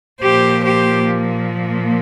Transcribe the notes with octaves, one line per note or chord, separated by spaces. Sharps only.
A#2 F3 A#3 G4 C5
G4 C5